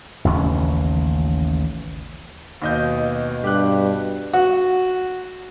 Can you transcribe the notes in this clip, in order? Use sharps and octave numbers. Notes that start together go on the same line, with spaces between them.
A1 D#2 C#3 C#4
D#2 B2 D#5 G6
G2 G4 F#6
F#4